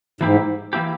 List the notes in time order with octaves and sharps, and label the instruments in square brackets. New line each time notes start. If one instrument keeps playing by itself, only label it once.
[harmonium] G#2 [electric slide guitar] E3 A#3 E4 G4
[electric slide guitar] E3 A#3 E4 G4